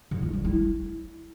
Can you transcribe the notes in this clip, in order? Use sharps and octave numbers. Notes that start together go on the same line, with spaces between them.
D3
F4
G3
E4